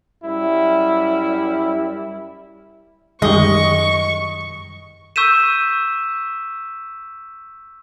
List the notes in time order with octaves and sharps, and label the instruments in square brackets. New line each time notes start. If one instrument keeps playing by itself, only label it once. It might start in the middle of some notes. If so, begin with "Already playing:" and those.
[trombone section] F#2 G3 E4
[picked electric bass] F#2 D#3 [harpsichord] G#3 G4 [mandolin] D#5 [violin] C#6
[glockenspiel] C#6 E6 G6 B6 D#7 E7